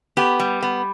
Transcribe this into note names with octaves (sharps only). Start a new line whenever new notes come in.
B3 G4
G3
B3